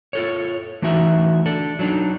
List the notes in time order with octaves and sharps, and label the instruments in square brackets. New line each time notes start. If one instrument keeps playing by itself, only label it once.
[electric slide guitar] F4 A4 C#5
E3 A3 D#4 F#4 E5
D4 A4
F#3 D4 D#4